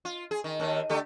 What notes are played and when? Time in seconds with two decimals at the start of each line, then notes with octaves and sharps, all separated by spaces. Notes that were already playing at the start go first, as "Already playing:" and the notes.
0.05 F4
0.31 G#4
0.44 D#3
0.60 D#2 D#3
0.90 D3 A3 G4